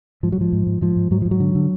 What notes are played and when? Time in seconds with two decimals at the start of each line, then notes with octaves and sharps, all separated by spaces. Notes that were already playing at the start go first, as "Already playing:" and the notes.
0.23 G#2 F3
0.32 F#3
0.38 G#2 F3
0.53 G#2
0.67 G#2
0.81 G#2 F3
0.96 G#2
1.11 G#2 F#3
1.22 G#2 F3
1.31 F#3
1.40 D3
1.55 D3